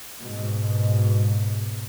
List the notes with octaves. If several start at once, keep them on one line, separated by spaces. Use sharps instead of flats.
G#2 B2